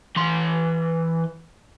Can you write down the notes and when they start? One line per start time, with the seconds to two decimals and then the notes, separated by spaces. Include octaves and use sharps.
0.16 E3 C6